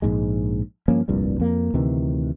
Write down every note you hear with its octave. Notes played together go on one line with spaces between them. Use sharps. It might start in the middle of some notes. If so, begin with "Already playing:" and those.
A#1 G#2 G#3
G2 F3 A#3 C#4
F1 C2 G2 A#2
F2 A#3
D2 C3 D#3 E3